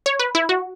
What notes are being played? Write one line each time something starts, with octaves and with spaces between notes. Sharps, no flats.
C#5
B4
E4
F#4